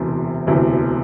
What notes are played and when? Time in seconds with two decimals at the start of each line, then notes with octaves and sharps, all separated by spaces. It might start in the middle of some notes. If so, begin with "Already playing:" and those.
Already playing: E1 D2 C3 E3
0.47 E1 D2 C3 E3